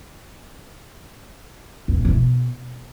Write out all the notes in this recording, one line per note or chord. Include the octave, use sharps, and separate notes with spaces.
E2
A2
E3
B2